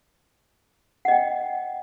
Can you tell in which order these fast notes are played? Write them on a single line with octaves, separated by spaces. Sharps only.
F#5 D#5 G5